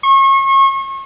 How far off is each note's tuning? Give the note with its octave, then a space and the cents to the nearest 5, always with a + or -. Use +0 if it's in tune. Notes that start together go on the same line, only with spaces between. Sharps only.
C#6 -35